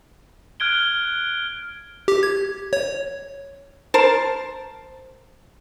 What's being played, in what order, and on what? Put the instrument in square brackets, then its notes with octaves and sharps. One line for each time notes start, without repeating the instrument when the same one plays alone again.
[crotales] F6 F#6 G#6 D7 G7
[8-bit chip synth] G4
G#6
C#5
[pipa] A#4 C5 A5